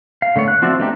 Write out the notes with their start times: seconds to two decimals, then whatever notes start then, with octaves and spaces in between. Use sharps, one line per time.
0.22 F5
0.36 D3 A3 B3 C#5
0.48 F#6
0.62 F3 C4 F#4 D5 E5
0.79 A3 B3 D4 D#4 G4